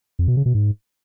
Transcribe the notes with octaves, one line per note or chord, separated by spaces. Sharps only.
F2
B2
C#3
B2
G#2